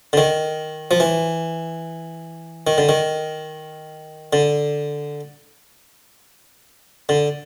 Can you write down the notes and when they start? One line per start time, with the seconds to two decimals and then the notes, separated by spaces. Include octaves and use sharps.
0.13 D3
0.17 D#3
0.91 F3
1.00 E3
2.67 D#3
2.78 D3
2.89 D#3
4.33 D3
7.09 D3